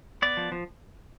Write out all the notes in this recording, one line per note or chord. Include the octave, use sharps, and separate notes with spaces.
B3 D5
F3
F3